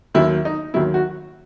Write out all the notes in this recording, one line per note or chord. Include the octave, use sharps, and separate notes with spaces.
D#2 D#3 F#3 E4
D#4
D#2 D#3 F#3 E4
F#4